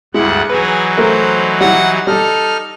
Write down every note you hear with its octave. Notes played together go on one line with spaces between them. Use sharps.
D2 G2 G#3 E4 F#5
E3 F#3 D#4 G#4 B4
A3 A#4 C5
G3 E4 F#5
G3 D#4 A4 F6